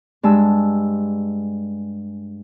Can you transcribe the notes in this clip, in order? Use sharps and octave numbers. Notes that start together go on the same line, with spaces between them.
G2 G#3 A5 E6